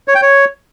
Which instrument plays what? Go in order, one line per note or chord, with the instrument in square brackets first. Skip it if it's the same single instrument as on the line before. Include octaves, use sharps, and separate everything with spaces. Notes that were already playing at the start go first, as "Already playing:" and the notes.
[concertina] C#5
G5
C#5